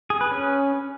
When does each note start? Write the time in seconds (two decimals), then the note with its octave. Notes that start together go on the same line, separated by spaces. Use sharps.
0.10 G#4
0.21 B4
0.31 C#4